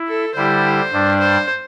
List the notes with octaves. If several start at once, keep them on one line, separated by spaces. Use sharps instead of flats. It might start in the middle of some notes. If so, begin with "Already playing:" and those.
Already playing: E4
A4
D3 G3 E4 G4 C5
G2 G3 D4
C5